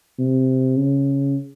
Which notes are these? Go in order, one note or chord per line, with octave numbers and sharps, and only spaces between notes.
C3
C#3